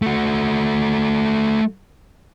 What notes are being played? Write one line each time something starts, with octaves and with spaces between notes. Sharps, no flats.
A3 F#4